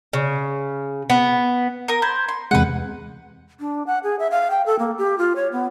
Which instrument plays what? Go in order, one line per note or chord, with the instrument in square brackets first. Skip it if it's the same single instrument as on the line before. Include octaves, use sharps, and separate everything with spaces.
[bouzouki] C#3
B3
[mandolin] A#4 D#6
[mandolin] C5 [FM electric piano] A#5 B5 G#6
[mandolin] C6
[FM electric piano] E2 C3 G#3 [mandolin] B4 F#5
[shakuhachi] D4
F#5
G#4
E5
F5
G5
A4
A#3
G4
F4
C#5
B3